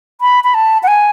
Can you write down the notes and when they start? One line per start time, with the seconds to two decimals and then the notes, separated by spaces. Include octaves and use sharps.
0.21 B5
0.44 B5
0.54 A5
0.83 F#5
0.88 G#5